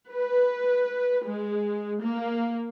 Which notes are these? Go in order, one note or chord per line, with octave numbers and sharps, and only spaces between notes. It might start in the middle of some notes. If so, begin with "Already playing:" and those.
B4
G#3
A#3